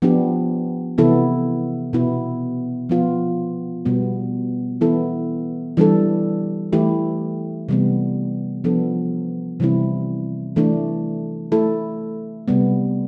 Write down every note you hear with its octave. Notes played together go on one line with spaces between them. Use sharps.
F3 B3 D4 G4
C3 E3 B3 E4 A4
B2 B3 E4
F3 B3 F4
B2 G3 B3
E3 B3 E4 A4
E3 G3 D4 A4
E3 A3 E4 G4
C3 E3 G3 B3
F3 B3 D4 A4
C3 E3 G3 C4 E4
E3 A3 D4
A3 E4 A4
C3 G3 B3